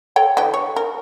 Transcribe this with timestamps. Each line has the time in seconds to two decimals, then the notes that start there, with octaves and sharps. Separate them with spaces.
0.16 A4 C#5 G5
0.37 D3 E3 G4
0.54 C#5
0.76 A#4